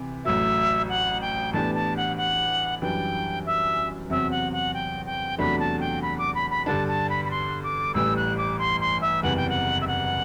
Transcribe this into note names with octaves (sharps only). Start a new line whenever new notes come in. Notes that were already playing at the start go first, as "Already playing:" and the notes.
Already playing: C3 E3
A1 A2 F#3 E5
F#5
G5
A2 E3 B3 D4 G4 A5
A5
F#5
F#5
F#2 E3 G3 D4 G5
E5
E2 C3 F#3 C4 E5
F#5
F#5
G5
G5
E2 C3 F#3 A3 D4 B5
A5
G5
B5
D6
B5
B5
G2 D3 G3 D4 A5
A5
B5
B5
C6
D6
A1 A2 E3 G3 E6
F#6
D6
C6
C6
E5
F#1 E2 C3 E3 G3 F#5
G5
F#5
E5
F#5